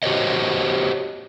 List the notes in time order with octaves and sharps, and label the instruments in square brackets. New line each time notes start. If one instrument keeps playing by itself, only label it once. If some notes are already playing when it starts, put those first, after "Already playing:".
[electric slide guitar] F#4 G4 C5 C#5 D#5